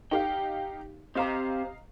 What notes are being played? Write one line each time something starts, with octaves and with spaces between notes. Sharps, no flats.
D#4 G4 F5 G5
C4 G4 C5 D#5 F5 A#5